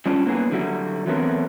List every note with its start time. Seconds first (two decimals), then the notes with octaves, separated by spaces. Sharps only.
0.06 F#3 G3 C#4 D4 F4
0.26 F#3 A#3 B3 E4 G#4
0.51 D3 F#3 G3 E4 F#4
1.06 E3 F#3 A3 B3 C4 A#4